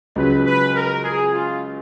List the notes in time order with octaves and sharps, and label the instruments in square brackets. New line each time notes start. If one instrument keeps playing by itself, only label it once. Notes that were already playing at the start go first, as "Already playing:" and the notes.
[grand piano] C#2 C#3 F#3 [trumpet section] B4
[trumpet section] B4
A#4
G#4
F4